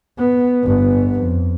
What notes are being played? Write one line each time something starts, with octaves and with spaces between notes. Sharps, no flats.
B3
G1 B3
F2